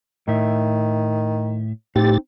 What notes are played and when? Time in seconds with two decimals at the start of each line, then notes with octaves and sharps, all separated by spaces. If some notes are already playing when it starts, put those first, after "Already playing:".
0.28 A2 D#3 E5
1.96 A2 C4 D#4 G4 A6